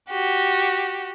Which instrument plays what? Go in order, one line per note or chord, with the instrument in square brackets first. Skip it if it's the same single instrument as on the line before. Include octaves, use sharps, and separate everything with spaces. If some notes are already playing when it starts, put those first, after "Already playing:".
[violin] F#4 G4